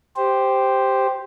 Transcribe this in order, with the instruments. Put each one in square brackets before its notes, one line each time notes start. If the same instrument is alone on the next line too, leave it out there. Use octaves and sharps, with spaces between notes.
[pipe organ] G4 C5